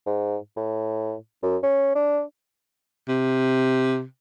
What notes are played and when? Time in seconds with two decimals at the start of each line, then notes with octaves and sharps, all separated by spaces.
0.07 G#2
0.56 A2
1.43 F#2
1.63 C#4
1.95 D4
3.08 C3